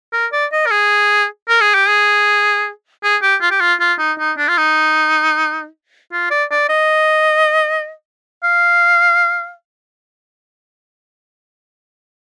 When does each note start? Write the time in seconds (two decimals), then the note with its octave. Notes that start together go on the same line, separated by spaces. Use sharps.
0.13 A#4
0.32 D5
0.52 D#5
0.66 A#4
0.71 G#4
1.48 A#4
1.61 G#4
1.75 G4
1.89 G#4
3.03 G#4
3.22 G4
3.41 F4
3.51 G4
3.60 F4
3.80 F4
3.99 D#4
4.19 D#4
4.38 D4
4.48 F4
4.58 D#4
6.12 F4
6.31 D5
6.51 D5
6.69 D#5
8.44 F5